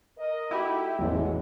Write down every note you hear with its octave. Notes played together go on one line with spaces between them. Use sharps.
A#4 D#5
A3 D#4 E4 F#4 G4
A1 E2 B2 F#3 G#3